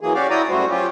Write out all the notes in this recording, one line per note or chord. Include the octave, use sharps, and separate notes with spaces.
E3 F#3 A#3 G#4
C#4 F#4 G4 D5 F5
E4 F#4 D5 G5 A#5 D#6
F#2 G3 A3 F#4 C5
F#3 C#4 F4 G4